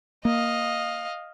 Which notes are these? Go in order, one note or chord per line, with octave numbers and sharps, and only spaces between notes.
A#3 D#5 F5